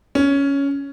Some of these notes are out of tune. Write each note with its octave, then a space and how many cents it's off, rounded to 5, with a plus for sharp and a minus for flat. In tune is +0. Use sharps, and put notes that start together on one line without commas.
C#4 +10